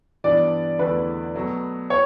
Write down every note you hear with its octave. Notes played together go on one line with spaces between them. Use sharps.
G2 E3 B3 D4 D5
E2 D3 A3 E4 B4
B2 F#3 A3
C#5